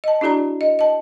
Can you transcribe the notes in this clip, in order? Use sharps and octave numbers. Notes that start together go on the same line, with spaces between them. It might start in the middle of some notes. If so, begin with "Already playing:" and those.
D#5 A5
D4 E4 F#4 G#4 D5 A#5
D#5
D#5 A5